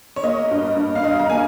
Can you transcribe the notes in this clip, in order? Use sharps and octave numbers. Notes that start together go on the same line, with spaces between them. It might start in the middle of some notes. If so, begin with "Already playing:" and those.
C#5
A#3 D#5
G2
G2
F5
G2 D#5
A#5
A#3 G#5